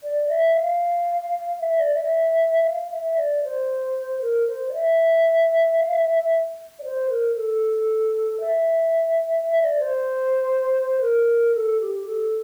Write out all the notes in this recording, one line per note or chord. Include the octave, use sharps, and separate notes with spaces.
D5
E5
F5
E5
D5
E5
F5
E5
D5
C5
A#4
C5
D5
E5
F5
E5
E5
E5
D5
C5
A#4
A4
E5
E5
D5
C5
A#4
A4
G4
A4